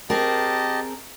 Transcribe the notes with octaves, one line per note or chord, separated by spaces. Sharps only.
C4 G4 G#4 A#4 D#5 A5